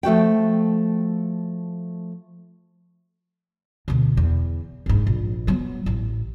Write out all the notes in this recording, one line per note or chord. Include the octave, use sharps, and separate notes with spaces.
F3 A3 F#4 G5
D2 B2
E2
F#1 G#2
A#1
F#3 B3
A1